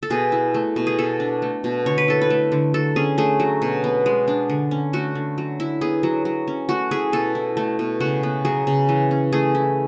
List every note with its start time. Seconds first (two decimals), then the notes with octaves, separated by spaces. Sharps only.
0.03 A4
0.10 B2 G#4
0.32 E4
0.54 A3
0.76 B2
0.87 G#4
0.99 B2 A4
1.20 D4
1.42 A3
1.64 B2
1.86 D3 C#5
1.98 B4
2.08 E4 A4
2.22 B4
2.30 A3
2.52 D3
2.74 F#3 A4
2.96 C#4 G#4
3.18 A3 G#4
3.40 F#3
3.62 B2
3.84 B3
4.06 G#3
4.28 D4
4.50 D3
4.71 C#4
4.93 A3 F#4
5.15 D3
5.38 F#3
5.60 E4
5.81 B3 G#4
6.03 F#3
6.25 F#3
6.48 C#4
6.69 A3 F#4
6.91 E4 G#4
7.13 B2 A4
7.35 E4
7.57 A3
7.79 B2
8.00 C#3 F#4
8.23 B3
8.45 F#3 G#4
8.67 C#3
8.89 E3
9.11 C#4
9.33 A3 G#4
9.55 E4